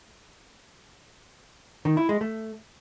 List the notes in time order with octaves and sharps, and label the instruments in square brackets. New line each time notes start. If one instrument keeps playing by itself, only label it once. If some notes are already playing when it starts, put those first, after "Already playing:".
[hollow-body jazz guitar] D#3
E4
G#3
A3